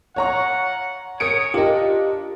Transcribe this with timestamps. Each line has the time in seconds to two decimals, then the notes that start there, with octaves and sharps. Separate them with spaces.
0.16 F4 C#5 F#5 A#5 C#6
1.20 G#4 A#4 C#5 D#6 C#7 D7
1.54 D4 F4 G4 A#4 D#5